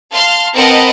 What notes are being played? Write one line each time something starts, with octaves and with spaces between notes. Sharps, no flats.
F5 A5 C6 F6
C4 A#4 B4 D#5 F#5 A5